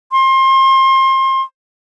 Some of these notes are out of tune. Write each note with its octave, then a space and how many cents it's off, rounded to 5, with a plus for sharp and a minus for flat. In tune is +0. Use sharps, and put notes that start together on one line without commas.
C6 +30